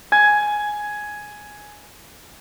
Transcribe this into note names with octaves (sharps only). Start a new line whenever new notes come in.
G#5 G#6